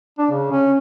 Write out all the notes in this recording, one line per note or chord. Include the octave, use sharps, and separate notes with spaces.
D4
C#3
C#4